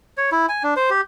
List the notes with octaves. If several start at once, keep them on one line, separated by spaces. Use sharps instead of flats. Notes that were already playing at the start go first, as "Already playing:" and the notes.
C#5
E4
G#5
D4
C5
G4